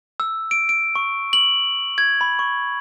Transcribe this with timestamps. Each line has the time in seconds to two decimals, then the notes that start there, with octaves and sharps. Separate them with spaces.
0.20 E6
0.51 D7
0.69 D7
0.95 C#6
1.33 F#7
1.98 G#6
2.21 B5
2.39 C#6